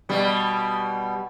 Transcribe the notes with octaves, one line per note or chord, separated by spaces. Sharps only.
B2 G3